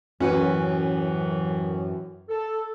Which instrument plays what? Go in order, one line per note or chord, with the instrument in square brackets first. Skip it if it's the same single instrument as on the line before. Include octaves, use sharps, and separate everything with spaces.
[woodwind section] C2 A2 E3 [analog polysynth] F#2 [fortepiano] C#4 F#4 B4
[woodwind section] A4